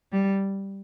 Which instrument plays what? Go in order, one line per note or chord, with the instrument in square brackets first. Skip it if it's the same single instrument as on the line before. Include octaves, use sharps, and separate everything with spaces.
[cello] G3